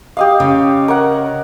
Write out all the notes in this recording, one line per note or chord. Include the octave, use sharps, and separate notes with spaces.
G4 D#5 F5
C#3
A#4 C#5 F#5